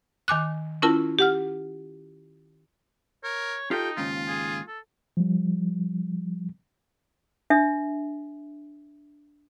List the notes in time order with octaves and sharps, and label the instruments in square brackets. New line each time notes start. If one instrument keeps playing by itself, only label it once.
[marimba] D#3 G#5 D6 F#6
C#4 E4 F4 A#4 A5
G4 F#5 F6
[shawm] A#4 [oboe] C#5
[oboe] D#4 [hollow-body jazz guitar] F4 G4 A4 [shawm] G5
[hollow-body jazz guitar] D#2 G#2 C#3 [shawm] F4
[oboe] G#4
A4
[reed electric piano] F3 G3
[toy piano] D4 E5